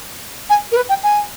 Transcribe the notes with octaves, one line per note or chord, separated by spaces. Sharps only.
G#5
A#4
B4
G5
G#5